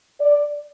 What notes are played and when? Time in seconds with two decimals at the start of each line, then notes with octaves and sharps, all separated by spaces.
0.20 D5